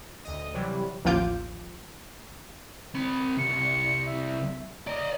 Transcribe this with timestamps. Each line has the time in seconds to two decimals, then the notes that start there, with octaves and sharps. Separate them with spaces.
0.25 D2 D#5
0.54 C3 E3 F#3 G3
1.05 A1 D#2 F3 F4 D6 G6
2.95 C4 B5
3.38 C2 C#7
4.06 E5
4.87 D5 D#5 A#5